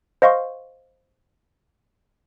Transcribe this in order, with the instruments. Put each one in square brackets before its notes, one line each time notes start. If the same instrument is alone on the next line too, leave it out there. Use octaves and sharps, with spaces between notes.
[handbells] C5 D#5 F5 C6 C#6